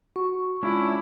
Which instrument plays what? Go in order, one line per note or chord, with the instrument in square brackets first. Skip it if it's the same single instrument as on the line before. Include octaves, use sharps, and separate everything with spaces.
[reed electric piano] F#4 [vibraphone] C#6
[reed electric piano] G#3 F4 [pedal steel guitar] C#4 D4 [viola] E4